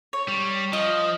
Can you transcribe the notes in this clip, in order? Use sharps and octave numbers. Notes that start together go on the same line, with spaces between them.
C#5
G3
F3 D#5